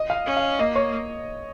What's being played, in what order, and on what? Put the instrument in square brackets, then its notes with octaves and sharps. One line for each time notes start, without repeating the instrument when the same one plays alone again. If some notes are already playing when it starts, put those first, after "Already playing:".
Already playing: [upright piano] D#5
F5
[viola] C#4
[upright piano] F5
[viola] A#3 [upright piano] D#5
[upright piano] C#5